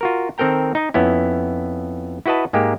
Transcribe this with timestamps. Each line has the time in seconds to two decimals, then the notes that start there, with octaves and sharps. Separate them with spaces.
0.01 F4 F#4 A#4
0.38 D#3 C4 A4 A#4 G5 A#5
0.75 D#4 D#5
0.94 F2 B3 C#4 E4
2.26 E4 F#4 B4 D#5 A5
2.53 G#2 G#3 A#3 G4